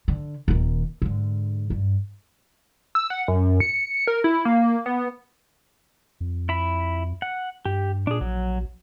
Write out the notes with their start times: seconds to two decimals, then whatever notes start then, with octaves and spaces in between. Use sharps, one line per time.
0.08 D3
0.48 D#1 D#3
1.02 G#2 D3
1.70 G2
2.95 E6
3.10 F#5
3.28 F#2
3.60 C#7
4.07 A#4
4.24 E4
4.45 A#3
4.86 B3
6.20 F2
6.49 E4 B5
7.22 F#5
7.65 G2 G4
8.07 A#2 D4 G#4
8.21 A#1 F#3